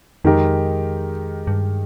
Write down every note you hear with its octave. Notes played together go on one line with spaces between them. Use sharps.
F2 D#3 G#3 D#4 G4 A#4
G2